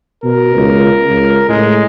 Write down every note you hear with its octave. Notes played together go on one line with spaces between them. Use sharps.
B2 A#4
C#2
C#2
A2 G#3